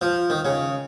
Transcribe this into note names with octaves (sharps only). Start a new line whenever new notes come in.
F3
D#3
C#3